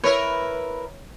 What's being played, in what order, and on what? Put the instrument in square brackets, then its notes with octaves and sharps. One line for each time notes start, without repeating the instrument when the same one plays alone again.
[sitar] E4 A#4 B4 [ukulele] C#5